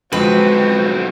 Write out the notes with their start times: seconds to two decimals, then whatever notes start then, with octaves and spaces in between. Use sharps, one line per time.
0.13 B1 D3 F3 G#3 C4 F#4 B4